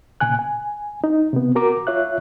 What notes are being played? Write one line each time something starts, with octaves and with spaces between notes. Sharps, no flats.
A#2 C#3 G#5 F#6
G#5
D#4
C3 B3
F#4 A#4 A#5 D6
F4 C#5 E5 F#6